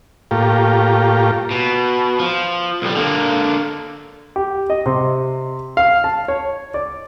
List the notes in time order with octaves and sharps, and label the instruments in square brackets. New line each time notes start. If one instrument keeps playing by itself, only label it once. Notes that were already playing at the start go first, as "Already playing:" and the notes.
[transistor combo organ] A2 A#3 F4 G4
[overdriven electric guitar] B2
F3
B1 G3
D3 A#3
[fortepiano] G4
D#5
C3
F5
A5
C#5
D5